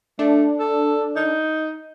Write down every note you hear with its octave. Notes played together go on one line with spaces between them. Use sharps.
A3 D4
A4
D#4